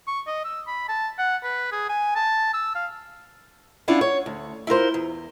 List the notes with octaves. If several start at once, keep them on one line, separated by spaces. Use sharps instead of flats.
C#6
D#5
E6
B5
A5
F#5
B4
G#4
G#5
A5
E6
F5
C#4 D4 E4 F4 F5 F#5
C#5
D2
E4 F4 A#4 C5
E2